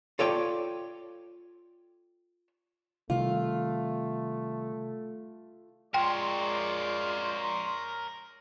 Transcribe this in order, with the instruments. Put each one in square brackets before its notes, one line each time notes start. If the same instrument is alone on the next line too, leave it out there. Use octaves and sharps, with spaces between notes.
[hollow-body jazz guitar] F4 A4 C#5 D5 G5
[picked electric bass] C3 D#3 G3 [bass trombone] A3 [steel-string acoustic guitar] F4
[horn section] G#3 F4 D5 [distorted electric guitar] A#4 C#5 [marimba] G5 [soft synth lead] C6